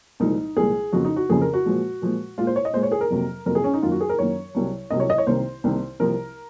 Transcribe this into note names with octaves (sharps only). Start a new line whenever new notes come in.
C2 A#2 F3 G#3 D#4
C2 A#2 F3 G#3 G#4
F2 C#3 F3 A#3 F#4
D#4
F#4
F2 C#3 F3 A#3 G#4
A#4
F#4
A#2 F3 G#3
A#2 F3 G#3
A#2 G#3 F4
C5
C#5
D#5
A#2 G#3 C5
C#5
G#4
A#4
F2 C3 F#3 A#3
F2 C3 F#3 A#3 A#4
G#4
C#4
D#4
F#2 D#3 A#3 F4
F#4
G#4
A#4
F#2 D#3 A#3 C#5
C2 C3 F#3
C2 C3 F#3 D#5
C#5
D#5
C#5
C2 C3 D#3 A#3 C5
C2 C3 D#3 A#3
C2 C3 F3 A#3 A#4